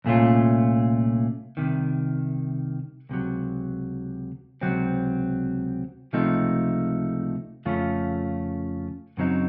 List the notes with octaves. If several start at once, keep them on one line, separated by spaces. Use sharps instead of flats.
C2 A#2 A3 C#4 F4
C2 C3 D#3
C#2 C3 F#3
C#2 C3 F#3 C4
C#2 C3 F3 A3 D#4
F2 C#3 A3 C#4 F4
F#2 C#3 F#3 C4 D#4